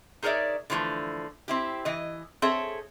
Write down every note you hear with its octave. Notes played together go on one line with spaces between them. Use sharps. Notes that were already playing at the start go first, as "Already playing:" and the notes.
D#4 G#4 A#4 C#5 D5 E5
D3 E3 F3 G#3 A3
C4 E4 G4
E3 D#5
C4 G#4 A4 C#5 E5